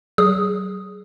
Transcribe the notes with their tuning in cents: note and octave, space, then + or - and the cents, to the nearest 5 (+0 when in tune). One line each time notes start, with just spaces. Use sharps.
F#3 +40 G#4 +5 D#6 +0